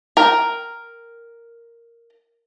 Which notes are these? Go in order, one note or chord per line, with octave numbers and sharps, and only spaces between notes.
A#4 G5